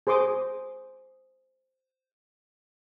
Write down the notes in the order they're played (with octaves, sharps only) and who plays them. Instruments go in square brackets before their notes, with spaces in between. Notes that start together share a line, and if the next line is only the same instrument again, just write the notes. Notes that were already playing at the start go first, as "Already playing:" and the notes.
[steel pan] G#4 C5 C6 D6 D#6